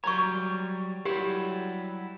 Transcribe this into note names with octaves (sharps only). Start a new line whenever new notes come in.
F#3 G3 C#5 A#5 C#6
F#3 G3 E4 G4